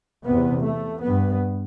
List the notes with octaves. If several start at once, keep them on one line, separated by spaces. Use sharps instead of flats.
E2 C3 B3
A3
G2 B3